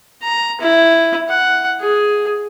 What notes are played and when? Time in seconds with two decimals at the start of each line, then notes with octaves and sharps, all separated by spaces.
0.22 A#5
0.61 E4
1.28 F#5
1.80 G#4